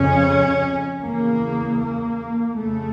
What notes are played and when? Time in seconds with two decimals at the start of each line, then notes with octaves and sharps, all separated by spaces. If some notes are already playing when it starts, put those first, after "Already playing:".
Already playing: F2 C#3 C#4
1.03 E2 C#3 A#3
1.80 A#3
2.57 F2 C#3 A3